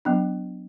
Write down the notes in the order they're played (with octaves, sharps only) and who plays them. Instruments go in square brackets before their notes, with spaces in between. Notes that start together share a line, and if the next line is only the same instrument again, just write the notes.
[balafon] F#3 B3 D4